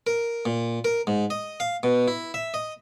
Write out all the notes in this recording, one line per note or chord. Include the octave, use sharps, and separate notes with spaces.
A#4
A#2
A#4
G#2
D#5
F5
B2
E4
E5
D#5